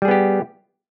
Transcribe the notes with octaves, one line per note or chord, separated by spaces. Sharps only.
G3 B3 G4 G#4